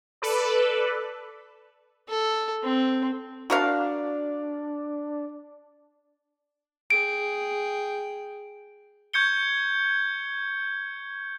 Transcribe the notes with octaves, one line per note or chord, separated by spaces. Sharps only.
A4 B4 D5
A4
C4
D4 F#4 A#4 F5
G#4 G5 D7
C#6 G6 G#6 C#7 G7